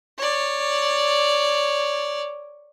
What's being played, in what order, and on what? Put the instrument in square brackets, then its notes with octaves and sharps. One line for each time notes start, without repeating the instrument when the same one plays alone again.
[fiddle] C#5 D5